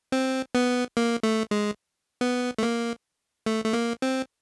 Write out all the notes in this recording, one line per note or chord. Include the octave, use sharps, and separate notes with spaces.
C4
B3
A#3
A3
G#3
B3
A3
A#3
A3
A3
A#3
C4